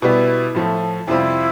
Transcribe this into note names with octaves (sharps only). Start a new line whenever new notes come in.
B2 G3 B3 E4
A2 F3 A3
F2 C3 G3 C4 E4 F4